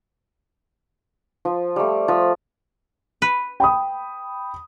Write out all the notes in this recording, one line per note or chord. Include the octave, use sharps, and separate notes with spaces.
F3
G3 A3
F3
B4
G5 B5 D#6